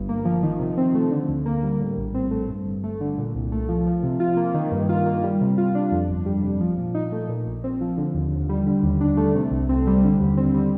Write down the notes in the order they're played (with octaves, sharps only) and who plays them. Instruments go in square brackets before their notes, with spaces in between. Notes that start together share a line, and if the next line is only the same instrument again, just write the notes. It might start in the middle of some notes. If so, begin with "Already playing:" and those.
Already playing: [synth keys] G1 G2
A#3
F3
D#3
C3
C4
A3
D3
D2
A#3
G3
A2
A#1
C4
A3
G2
G1
A3
D3
A#2
C2
A3
F3
F3
C3
F4
A#3
D#3
G2
F4
A#3
G3
C3
F4
D4
F2
G1
G3
C3
F3
A#2
D#4
A3
A#2
A#1
C4
F3
D3
D#2
D#2
G3
D3
D#2
D4
A3
C3
C2
C4
G3
D3
D#2
C4
G3